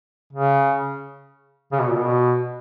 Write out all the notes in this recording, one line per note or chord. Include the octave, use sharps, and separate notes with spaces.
C#3
C#3
B2
A#2
B2